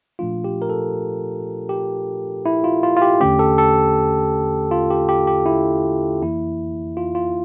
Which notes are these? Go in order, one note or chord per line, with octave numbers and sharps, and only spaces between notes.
A#2 F3 A3 D4 F4
G4
A#4
A4
G4
E4
F4
F4
F4
G4
E2 D3 A3 C#4 G4
A4
A4
F4
G4
G4
G4
E4
F2 E3 A#3 E4
F4
F4